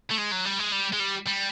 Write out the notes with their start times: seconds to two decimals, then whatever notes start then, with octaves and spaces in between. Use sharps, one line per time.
0.10 A3
0.18 G#3
0.31 F#3
0.45 G3
0.59 G#3
0.72 G3
0.93 G#3
1.00 G3
1.27 G3